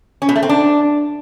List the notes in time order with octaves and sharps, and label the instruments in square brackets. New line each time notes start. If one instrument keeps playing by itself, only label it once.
[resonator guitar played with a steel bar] C#4
B2
A3
C4
D4